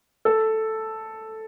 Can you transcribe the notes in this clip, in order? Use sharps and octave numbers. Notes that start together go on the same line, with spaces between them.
A4